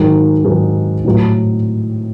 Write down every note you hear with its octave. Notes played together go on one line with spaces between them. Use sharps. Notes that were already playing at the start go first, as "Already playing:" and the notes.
Already playing: G#2 D#3 F#3
G#2 D#3 F#3
A2 F#3